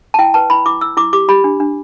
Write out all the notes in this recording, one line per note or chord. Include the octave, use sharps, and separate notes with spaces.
A5
E4 G5
B4 A5
E4 B5
E4 D6
E4 E6
E4 D6
G4 D6
G4 B5
D4
D4